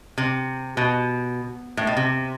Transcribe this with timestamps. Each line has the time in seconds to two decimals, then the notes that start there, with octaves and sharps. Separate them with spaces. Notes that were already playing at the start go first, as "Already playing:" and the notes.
0.18 C3
0.77 B2
1.77 A2
1.87 B2
1.97 C3